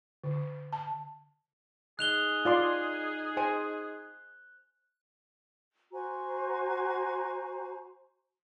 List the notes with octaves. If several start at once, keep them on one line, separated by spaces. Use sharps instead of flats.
D3
A5
D#4 G#4 F#6 F7 G7
F4 D5 C6
C5 G#5
F#4 C5 G#5 A#5